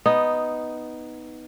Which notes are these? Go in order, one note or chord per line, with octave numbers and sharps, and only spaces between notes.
B3 D#4